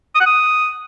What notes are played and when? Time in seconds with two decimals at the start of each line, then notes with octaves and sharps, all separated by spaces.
0.15 D#6
0.21 F#5
0.26 D#6